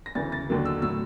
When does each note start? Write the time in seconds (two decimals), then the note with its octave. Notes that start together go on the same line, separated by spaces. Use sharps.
0.06 A#6
0.15 D2 C#3 E3 A6
0.32 A6
0.49 D#2 D3 F#3 A#3
0.65 E6
0.82 A2 F#3 E6